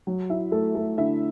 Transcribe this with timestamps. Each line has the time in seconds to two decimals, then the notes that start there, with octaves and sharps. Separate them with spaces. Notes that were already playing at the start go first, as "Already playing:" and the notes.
0.07 F#3
0.30 E4 E5
0.52 A3 A4
0.75 A3 A4
0.97 D3 E4 E5